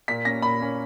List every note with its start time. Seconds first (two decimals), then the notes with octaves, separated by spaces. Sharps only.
0.08 A#2 B6
0.25 A#3 C#4 A#6
0.42 A#2 B5
0.60 A#3 C#4